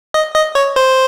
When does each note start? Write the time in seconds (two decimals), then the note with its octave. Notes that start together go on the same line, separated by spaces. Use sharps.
0.14 D#5
0.35 D#5
0.55 C#5
0.76 C5